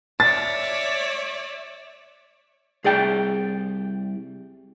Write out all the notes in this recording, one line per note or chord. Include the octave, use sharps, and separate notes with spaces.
C#5 D5 E5 A6
C2 G#4 D5 G5